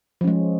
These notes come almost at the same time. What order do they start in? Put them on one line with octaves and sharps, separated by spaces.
F3 C#4 G#3